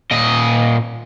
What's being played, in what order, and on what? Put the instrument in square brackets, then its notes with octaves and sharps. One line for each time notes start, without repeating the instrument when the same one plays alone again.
[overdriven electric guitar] A#2 D#5